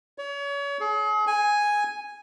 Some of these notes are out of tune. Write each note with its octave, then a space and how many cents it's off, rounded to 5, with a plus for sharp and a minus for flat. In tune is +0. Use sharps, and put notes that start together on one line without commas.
C#5 +35
G#4 +40
G#5 +0